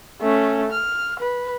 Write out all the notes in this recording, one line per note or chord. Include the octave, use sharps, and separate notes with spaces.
A3 C#4
F6
B4